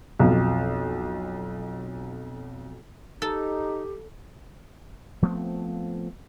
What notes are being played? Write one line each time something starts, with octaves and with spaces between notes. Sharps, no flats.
B1 F2
D#4 G4 A4
F3 A3 B3 C4